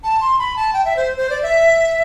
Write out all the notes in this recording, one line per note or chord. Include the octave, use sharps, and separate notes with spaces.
A5
C6
B5
A5
G5
E5
C5
C5
D5
E5